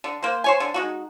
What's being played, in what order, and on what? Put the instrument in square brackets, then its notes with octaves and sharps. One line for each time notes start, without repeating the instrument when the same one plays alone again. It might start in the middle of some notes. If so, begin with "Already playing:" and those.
[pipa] D3
A#3 C5
C5 C#5 G#5
D3
G#3 D#4 F#4